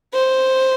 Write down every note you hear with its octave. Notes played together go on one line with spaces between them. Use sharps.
C5